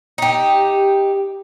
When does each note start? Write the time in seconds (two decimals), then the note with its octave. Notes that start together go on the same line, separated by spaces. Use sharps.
0.18 D#4 G4